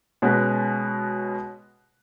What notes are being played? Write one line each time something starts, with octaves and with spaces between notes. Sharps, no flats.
B2 G#3 C#4 F#4 B4